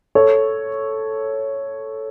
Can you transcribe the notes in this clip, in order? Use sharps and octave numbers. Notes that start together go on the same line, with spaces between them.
A4 C#5